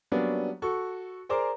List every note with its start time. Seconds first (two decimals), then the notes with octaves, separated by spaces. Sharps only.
0.12 F#3 G3 A#3 B3 C#4 D4
0.62 F#4 A4 C#6
1.29 G#4 A#4 C5 D5 A#5 D6